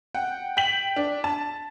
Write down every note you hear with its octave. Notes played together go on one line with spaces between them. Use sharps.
F#5 G5
G5 B6 F#7
D4
A5